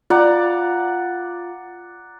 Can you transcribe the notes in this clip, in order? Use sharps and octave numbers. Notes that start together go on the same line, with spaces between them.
F4 D5 F#5 A#5